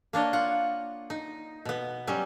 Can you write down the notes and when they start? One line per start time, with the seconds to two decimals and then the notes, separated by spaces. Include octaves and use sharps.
0.13 A#3 D4 C#5 D#5
0.33 F4 F#5
1.10 D#4
1.65 B2 B3
2.07 F#3 G3 C#4